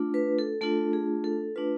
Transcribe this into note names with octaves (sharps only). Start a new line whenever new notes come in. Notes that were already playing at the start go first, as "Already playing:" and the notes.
Already playing: A3 D4 F4
B4
A4
A3 D4 F4 A4
G#4
A4
A3 D4 F4 B4